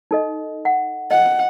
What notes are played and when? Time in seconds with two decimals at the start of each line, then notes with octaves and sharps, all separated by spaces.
0.11 D#4 A4 D#5
0.65 F#5
1.11 D#5 F#5